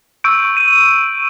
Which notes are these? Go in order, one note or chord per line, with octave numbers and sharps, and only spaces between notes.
C#6 E6 G6 D7
D#7